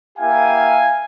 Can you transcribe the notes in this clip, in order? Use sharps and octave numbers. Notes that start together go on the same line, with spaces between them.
A#3 E4 G4 F5 G#5